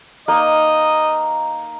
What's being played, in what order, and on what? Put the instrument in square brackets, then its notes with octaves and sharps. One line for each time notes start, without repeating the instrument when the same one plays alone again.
[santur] A#3 D#4 [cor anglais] D#5